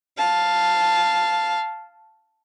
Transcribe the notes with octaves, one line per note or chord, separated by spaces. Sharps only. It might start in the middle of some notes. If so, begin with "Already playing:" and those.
F5 A5